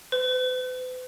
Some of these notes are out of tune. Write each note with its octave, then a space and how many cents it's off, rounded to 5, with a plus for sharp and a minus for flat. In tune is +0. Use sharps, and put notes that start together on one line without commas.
B4 +45